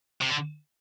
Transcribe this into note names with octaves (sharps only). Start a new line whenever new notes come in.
C3
D3